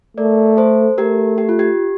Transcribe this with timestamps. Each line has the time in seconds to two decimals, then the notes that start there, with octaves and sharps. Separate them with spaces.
0.17 A3 A#4 D5
0.57 A4 C5
0.98 A3 G4 A#4
1.38 G4
1.49 F4
1.59 G4